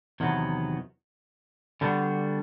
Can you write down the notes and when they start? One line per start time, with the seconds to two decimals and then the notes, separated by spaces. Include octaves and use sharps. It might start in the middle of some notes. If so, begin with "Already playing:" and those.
0.20 E2 C3 D#3 F#3 B3
1.81 D3 G3 B3 D4 F#4